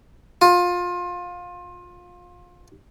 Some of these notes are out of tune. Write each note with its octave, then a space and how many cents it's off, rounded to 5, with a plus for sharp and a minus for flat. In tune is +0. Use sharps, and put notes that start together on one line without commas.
F4 +25